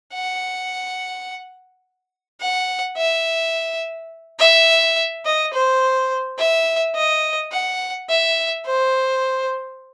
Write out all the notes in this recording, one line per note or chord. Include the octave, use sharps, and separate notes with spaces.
F#5
F#5
E5
E5
D#5
C5
E5
D#5
F#5
E5
C5